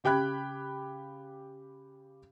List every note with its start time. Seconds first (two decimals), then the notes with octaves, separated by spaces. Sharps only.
0.04 C#3 G4 G5 B5 F#6 G#6